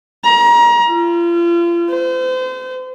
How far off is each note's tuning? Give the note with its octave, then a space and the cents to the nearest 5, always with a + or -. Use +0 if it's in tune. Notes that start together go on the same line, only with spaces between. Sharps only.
A#5 +30
F4 -35
C5 -35